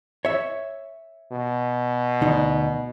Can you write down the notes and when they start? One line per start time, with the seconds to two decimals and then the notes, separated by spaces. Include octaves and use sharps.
0.25 C#5 E5
1.32 B2
2.21 D2 D#4